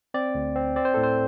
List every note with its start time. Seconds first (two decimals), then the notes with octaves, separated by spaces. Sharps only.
0.14 C4 D5
0.35 D2
0.56 C4
0.76 C4 D5
0.85 C5
0.94 A2 A4
1.03 C5